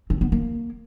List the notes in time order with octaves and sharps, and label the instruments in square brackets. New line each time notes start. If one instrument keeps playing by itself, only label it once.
[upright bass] C4
B3
A#3